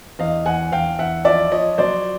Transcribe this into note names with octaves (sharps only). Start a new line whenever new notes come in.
E2 D#5 F5
E2 F#5 G#5
E2 F5 G5
E2 E5 F#5
F3 D5 E5
F3 C#5 D#5
F#3 C5 D5